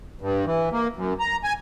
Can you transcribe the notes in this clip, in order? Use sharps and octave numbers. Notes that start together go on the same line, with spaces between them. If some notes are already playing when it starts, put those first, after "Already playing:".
G2
E3
A#3
F#2
A#5
G#5